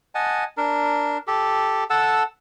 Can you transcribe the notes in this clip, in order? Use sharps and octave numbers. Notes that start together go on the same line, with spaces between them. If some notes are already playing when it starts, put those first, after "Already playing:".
D#5 F#5 G#5 A5
D4 A#4
G4 A4
A4 F#5 A5 E6